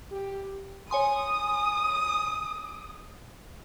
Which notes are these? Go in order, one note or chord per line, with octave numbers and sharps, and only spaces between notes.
G4
C#5 G#5 C6 D#6